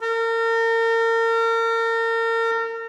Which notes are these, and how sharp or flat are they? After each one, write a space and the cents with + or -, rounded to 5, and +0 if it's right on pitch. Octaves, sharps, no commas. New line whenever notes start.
A#4 -35